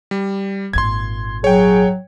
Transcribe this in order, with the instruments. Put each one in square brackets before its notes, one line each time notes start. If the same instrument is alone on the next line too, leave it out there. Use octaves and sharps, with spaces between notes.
[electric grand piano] G3
[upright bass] G#1 A#2 [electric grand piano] C6 G#6
[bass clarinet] F#3 [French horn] G#4 [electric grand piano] C#5 G5